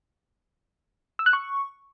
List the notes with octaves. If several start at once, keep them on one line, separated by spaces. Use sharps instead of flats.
E6
F#6
C#6